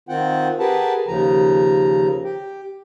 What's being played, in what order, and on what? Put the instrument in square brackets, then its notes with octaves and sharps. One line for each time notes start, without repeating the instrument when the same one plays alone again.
[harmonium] D#3 C4 F4 F#5 G5
G4 G#4 A#4 B4 F#5 A5
D#2 C#3 F3 A#5
G4